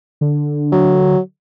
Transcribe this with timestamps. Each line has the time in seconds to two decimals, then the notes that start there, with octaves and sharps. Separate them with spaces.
0.21 D3
0.72 F#3